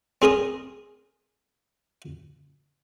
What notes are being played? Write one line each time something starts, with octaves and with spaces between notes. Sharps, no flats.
C4 G#4 A#4 D#6